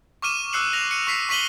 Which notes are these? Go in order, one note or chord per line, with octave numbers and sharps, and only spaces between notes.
C#6 D6 F6 D#7 E7
D6 E6 F#6 C7 C#7 F#7
A#6 F7
C#7 D#7
C#6 B6 C7
C#6 B6 D#7 F#7 G7